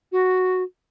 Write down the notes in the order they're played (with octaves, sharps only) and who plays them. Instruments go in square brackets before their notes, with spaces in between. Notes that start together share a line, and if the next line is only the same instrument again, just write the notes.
[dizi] F#4